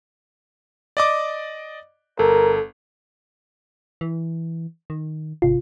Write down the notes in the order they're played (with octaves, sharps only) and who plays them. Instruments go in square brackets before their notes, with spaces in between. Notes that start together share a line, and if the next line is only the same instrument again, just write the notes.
[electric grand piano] D5 D#5 D6
[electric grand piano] G1 [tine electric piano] A4 [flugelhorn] A#4
[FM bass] E3
D#3
[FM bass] G#1 [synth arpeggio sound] C3 F4